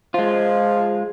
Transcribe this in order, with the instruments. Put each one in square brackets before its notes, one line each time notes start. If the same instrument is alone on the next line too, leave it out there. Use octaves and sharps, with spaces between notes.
[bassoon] F3 [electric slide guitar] G#3 F4